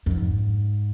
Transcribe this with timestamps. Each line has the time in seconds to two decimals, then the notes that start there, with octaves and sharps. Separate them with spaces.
0.06 F2
0.11 G#2